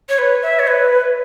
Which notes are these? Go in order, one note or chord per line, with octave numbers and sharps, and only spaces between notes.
C#5
B4
E5
C#5
B4